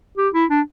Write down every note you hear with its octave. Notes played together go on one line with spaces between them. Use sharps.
G4
E4
D4